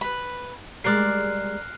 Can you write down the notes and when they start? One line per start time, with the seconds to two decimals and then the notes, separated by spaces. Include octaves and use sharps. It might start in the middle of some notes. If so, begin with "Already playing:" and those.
0.01 B4 B5
0.84 G3 G#3 A#4 D5 F6 F#6 C7